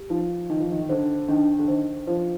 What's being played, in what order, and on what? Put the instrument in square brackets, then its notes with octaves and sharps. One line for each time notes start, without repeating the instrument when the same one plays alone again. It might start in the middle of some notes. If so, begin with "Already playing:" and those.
Already playing: [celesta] G4
[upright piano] F3 [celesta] D#4
[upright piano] D#3 [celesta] D#4
[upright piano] F3
D#3
D#3
[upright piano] D3 [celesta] C5
[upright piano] D#3 [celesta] D4
[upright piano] D3
[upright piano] D#3 [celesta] C5
[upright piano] F3 [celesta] C5